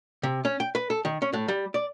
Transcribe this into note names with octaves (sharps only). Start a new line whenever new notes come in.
C3
C#4
G5
B4
A4
D#3
C#4
A2
G3
D5